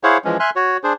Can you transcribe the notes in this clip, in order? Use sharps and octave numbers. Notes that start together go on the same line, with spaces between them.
E4 G#4 C5 C#5 F5 F#5
E3 F3 G#3 C#4
E5 G#5 C6 F6 F#6
F#4 C#5
D4 G#4 C5